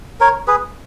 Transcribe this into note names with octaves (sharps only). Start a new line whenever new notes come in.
A#4 C#5
G#4 B4